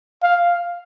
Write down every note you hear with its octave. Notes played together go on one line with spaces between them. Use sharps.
F5